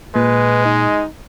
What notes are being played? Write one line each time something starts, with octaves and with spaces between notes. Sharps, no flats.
A#2 G#3 B4
D#4